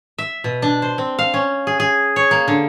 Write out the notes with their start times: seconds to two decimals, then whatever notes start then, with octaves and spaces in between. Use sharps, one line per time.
0.18 E5
0.44 B2
0.62 D4
0.82 C5
0.98 C4
1.19 F5
1.34 C#4
1.67 G#4
1.80 G#4
2.16 C#5
2.31 A#3
2.48 D3